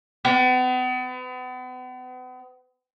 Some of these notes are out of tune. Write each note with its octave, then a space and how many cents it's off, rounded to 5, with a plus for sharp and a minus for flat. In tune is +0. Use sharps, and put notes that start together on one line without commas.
B3 +40